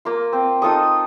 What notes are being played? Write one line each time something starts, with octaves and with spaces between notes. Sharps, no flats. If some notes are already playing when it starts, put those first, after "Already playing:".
A#3 F4
C4
D#4 F4 A4 D#6